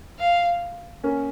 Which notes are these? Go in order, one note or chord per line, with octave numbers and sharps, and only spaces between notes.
F5
A#3 C#4